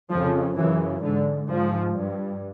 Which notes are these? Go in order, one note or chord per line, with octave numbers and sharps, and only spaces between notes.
F2 C#3 F3
F#2 C#3 E3
G#2 D3
G#2 F3
G2